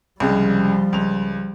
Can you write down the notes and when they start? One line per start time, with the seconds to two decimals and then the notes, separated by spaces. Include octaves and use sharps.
0.20 C2 C#3 F3 G3 G#3
0.93 C#2 F7